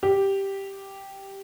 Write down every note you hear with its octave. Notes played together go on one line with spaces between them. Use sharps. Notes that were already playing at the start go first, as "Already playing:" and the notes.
G4